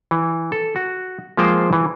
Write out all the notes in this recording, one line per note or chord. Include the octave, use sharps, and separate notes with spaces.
E3
A4
F#4
F3 G#3 A#3 F4 C5 G5
E3